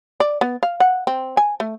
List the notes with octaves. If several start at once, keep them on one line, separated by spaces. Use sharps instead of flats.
D5
B3
F5
F#5
C4
G#5
A3